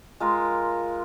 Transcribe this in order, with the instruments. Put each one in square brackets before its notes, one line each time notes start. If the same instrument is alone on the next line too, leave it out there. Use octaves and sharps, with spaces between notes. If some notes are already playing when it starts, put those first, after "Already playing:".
[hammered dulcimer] G#3 F4 A#4